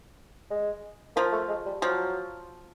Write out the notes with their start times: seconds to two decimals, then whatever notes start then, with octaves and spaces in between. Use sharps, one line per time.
0.51 G#3
1.16 F3 A#3
1.33 A3
1.49 G#3
1.66 G3
1.81 F3 F#3